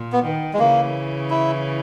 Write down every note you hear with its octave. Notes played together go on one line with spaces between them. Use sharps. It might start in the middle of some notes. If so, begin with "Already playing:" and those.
Already playing: A#2
B3
D#3
G#3
C#3 E3 A#3
E4